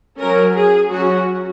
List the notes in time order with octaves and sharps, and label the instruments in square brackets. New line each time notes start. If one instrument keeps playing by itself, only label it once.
[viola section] F#3 C#4 A#4
G#4
F#3 C#4 F#4